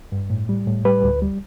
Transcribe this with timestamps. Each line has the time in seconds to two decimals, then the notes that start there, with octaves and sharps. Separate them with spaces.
0.12 G2
0.30 A2
0.49 G3
0.67 A2
0.85 G3 B4
1.04 D2
1.22 G3